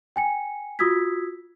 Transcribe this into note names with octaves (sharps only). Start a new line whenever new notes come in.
G5 G#5 C#7
F4 F#4 D#6 E6 G#6 B6